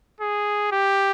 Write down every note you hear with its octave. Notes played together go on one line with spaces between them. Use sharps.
G#4
G4